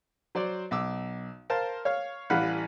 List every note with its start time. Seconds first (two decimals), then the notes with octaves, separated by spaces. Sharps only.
0.35 F#3 C5 D5
0.71 B1 D6 E6
1.50 A#4 C5 F5 A5
1.85 C#5 F5
2.30 A1 E3 G3 F5 F#5 B5